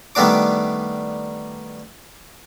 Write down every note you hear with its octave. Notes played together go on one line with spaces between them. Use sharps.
D#3 G3 A3 B3 D4 D6